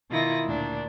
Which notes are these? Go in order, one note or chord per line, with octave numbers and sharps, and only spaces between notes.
B2 D#3 E4 F4 D#6 A#6
D2 A#2 D4